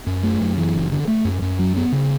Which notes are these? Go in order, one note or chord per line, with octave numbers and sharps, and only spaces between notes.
F#2
A3
F#2
E3
F#1
D3
A3
F#2
F#2
F#3
B3
C#3